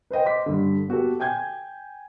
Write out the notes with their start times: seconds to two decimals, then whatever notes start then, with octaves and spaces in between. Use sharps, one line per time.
0.10 B4 C5 D#5 G5
0.25 D#5 C6 D6 B6
0.46 G2 D3
0.88 B3 F#4 G4 A4
1.20 G5 G#5 G6 G#6